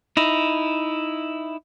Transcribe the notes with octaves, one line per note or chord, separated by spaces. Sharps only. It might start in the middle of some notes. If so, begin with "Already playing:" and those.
D#4 E4